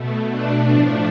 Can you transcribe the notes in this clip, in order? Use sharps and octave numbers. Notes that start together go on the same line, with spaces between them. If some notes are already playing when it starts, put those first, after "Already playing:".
Already playing: B2 A3
D4
A2 F3 A3